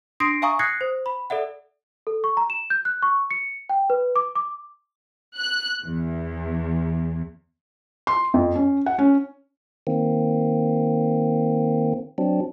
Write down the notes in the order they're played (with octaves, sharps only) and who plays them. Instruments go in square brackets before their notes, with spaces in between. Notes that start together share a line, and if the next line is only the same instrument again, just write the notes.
[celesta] D4 C6 D#6 A#6 C7 D7
E5 F5 G#5 A#5 C#6 D#6
D#6 F#6 G#6 A#6 C7 C#7
C5
B5
A4 D5 E5 F#5
A4
C#6
A#5
E7
G6
F#6
C#6
C#7
G5
B4
D6
D6
[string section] F#6
E2
[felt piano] C6
F2
C#4
F#5
C#4
[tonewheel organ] D#3 A#3 C4
F#3 C4 D4